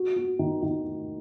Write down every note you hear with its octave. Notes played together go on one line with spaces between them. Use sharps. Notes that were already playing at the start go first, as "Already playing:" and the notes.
Already playing: F#4
F#4
D#3
D#3